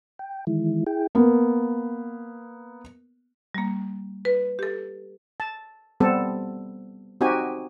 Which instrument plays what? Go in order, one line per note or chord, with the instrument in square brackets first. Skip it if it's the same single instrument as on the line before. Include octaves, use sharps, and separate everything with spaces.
[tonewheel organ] G5
D#3 E3 G#3 E4
E4 G#4 G5
[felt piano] A#3 B3
[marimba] G3 A#3
B4
G4 A4
[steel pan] A5
G3 B3 C4 A4
C4 D#4 F#4 G4 G#5